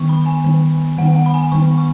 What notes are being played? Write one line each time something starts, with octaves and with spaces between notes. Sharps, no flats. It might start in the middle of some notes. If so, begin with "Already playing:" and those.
Already playing: D#3 B3 C#6
B5
G#5
D#3 B3
D#3 B3 F#5
F#5
B5
G#5
D#3 B3 C#6
C#6